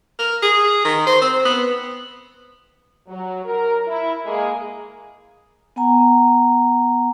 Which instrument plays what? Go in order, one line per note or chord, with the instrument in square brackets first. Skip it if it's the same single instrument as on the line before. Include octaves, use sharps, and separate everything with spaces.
[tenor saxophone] A#4
G#4
D#3
C5
C4
B3
[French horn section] F#3
A#4
E4
G#3 A#3 G#4
[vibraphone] B3 F#5 G#5 A#5